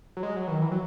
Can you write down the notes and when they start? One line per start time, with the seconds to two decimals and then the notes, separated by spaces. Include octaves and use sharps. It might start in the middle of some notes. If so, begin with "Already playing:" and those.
0.17 F#3
0.23 G#3
0.36 F#3
0.47 E3
0.51 D#3
0.62 E3
0.71 F#3